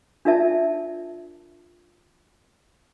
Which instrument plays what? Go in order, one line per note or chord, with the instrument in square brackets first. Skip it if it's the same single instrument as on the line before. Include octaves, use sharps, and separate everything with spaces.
[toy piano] D4 F4 A#4 D5 E5 A5